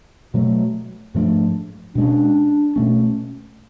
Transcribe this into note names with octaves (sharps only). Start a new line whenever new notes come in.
B2 F#3 A3
G#2 F3 A3 D4
B2 G#3 C#4 D4
B2 A3 C#4